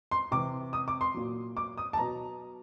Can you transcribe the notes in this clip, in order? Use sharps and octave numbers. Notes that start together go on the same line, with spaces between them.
C6
C3 E3 D6
D#6
D6
C6
A#2 F#3
D6
D#6
A5
B2 F#3 A#5